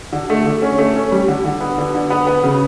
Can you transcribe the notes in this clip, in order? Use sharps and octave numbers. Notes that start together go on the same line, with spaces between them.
D3
A3
D3
C#4
A3
C#4
G3
D3
D3
B3
D3
D3
B3
B3
C#3